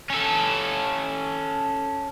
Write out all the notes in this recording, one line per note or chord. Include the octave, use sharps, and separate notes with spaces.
C#4 A4